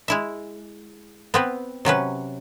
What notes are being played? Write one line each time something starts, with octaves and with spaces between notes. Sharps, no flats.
G#3 E4 E5
B3 C4 B4
C3 F#3 C#4 B4